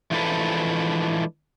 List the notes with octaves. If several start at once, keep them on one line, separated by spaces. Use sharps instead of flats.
E3 F3 G#3 D4 A4 B4